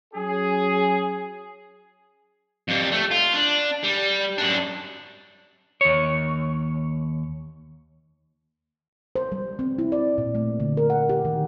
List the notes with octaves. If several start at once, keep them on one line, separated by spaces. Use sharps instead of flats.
F#3 C#4 G#4
F2 G3
A3
F4
D4
G3
F#2 D4
D#2 C#5
C5
G3
C4
E4
D5
A#2
A3
D3
A#4
F#5
G4
D#3